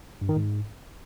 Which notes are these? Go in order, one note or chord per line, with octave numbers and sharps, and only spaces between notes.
G2
D#3
G#2